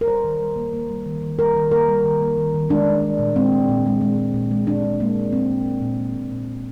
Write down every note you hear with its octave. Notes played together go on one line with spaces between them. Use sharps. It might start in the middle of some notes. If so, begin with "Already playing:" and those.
A#4
G3 C5
D#3
G3
A#3
A#3
G3
D#3
D#3
G3 A#4
D#3
A#3 A#4
G3
D#3
A#3
D#3
D#3
G#3 D4
G#3
G#3
A#2
G#3 C4
G#3
A#2
G#3
G#3
G#3
A#2
G#3
A#2 D4
G#3
G#3 A#3
A#2
G#3 C4
A#2
A#2
A#2
G#3
A#2
A#2
A#2